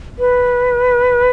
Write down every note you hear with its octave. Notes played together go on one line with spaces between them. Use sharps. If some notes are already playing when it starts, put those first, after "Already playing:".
B4